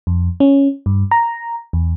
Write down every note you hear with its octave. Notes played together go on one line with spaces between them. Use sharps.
F2
C#4
G2
A#5
E2